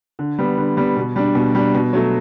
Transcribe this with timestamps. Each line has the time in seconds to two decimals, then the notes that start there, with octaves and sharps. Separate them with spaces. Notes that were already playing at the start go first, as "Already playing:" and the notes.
0.19 D3
0.39 G3 B3
0.57 D3
0.77 G3 B3
0.96 B2
1.16 G3 D4
1.35 B2
1.55 G3 D4
1.75 B2
1.93 F#3 A3